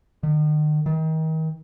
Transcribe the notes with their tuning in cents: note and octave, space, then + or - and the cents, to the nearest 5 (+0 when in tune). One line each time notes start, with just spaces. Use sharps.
D#3 -40
D#3 +35